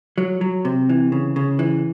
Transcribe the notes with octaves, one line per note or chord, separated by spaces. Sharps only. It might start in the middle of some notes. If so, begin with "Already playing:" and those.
F#3
F#3
C3
E3
C#3
C#3
E3